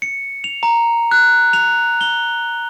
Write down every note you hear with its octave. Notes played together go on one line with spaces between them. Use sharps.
C#7
F7
A#5
F#6
F7
G7